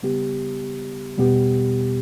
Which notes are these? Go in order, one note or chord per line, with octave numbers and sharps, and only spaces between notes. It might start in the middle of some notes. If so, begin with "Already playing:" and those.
C#3 G3 B3 G4
E2 B2 G3 B3 G4